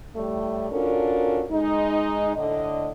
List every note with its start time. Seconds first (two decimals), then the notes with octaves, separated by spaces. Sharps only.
0.16 A2 G3 A3
0.71 C#4 D4 F4 F#4 A4 A#4
1.50 G#3 D#4
2.36 A2 D3 D#5